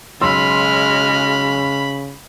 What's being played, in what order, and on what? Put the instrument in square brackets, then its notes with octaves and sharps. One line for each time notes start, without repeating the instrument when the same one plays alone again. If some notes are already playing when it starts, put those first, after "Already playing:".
[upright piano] B1 C6 E6 [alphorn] C#3 [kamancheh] G#3 F6 [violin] B5